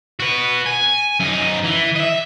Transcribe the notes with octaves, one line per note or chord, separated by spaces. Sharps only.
F#4 B4
G#5
F#2 D#4
E3
D#5 E5